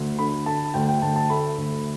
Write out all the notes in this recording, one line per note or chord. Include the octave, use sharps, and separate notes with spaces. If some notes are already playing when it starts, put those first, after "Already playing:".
Already playing: D2
D3 B5
D3 A5
D2 G5
G5
D2 A5
A5
A3 B5
D2